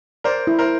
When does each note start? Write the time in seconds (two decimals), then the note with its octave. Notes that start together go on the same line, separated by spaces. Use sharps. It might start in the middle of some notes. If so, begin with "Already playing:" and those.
0.24 A#4 C5 D5
0.47 E4
0.59 A#4 C5